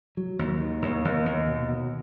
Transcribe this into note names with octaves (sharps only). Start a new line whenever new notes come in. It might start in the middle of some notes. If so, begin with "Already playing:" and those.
F#3
D#2
D#3
D#2
D#2
D#2
B2
B2